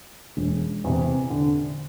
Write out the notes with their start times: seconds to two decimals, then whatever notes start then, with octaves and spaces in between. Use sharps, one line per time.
0.37 E1
0.84 E2 C3
1.30 D3